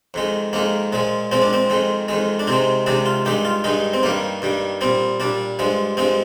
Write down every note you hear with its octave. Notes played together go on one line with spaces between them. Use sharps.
F2 D#3 G#3
F2 D#3 G#3 A#3
A#2 F3 G#3
A#2 F3 G#3 C4
D4
C4
F2 D#3 G#3
F2 D#3 G#3
D4
C3 D#3 G#3 C4
C3 D#3 G#3 D4
F4
G2 D#3 G#3 G4
F4
G2 D#3 G#3 D#4
C4
G2 D#3 G3 A#3
G2 D#3 G3
A#2 G3 C4
A#2 G3 D4
G2 F3 G#3
G2 F3 G#3 C4